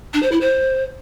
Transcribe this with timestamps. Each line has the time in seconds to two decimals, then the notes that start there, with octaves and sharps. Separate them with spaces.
0.13 D4
0.22 C5
0.32 E4
0.41 C5